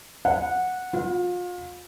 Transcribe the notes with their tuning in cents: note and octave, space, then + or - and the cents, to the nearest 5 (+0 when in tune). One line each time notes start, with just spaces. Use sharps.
F#5 -10
F4 +35